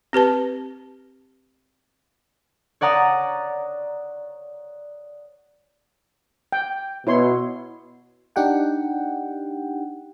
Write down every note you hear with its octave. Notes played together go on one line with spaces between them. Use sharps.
C4 G4 B4 A5
C#5 D5 F#5 A#5 D#6
G5
B2 E4 C#5 C6
D4 D#4 G4 F#5 G5